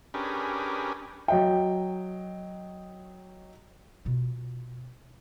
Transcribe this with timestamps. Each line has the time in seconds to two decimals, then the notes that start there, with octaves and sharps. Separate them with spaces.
0.14 C#4 D4 G4 G#4 A#4 B4
1.28 F#3 D#5 G5
4.05 B2 F4